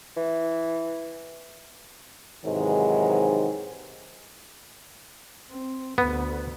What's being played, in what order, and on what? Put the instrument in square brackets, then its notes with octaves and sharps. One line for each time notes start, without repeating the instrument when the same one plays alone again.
[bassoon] E3
[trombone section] G#2 C3 D#3 E3 F#3 G#3
[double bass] C4
[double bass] D2 [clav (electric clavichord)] B3